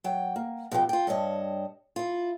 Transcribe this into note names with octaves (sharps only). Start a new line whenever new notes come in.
F#3 G5
A#3
B2 F3 G4 C5 G5
F4 G5
G2 G3 C#5 D#5 A5
E4 F4